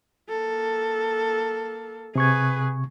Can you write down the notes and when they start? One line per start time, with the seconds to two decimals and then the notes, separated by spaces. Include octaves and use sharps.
0.30 A#3 A4
2.16 C3 G#4 B4 C#6 G#6